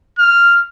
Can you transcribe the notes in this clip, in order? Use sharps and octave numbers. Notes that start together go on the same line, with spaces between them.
F6